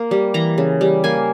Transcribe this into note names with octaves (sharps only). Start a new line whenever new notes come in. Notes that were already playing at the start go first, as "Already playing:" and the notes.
Already playing: A#3
G3
E3 A#5
C#3
G3
A#3 G#5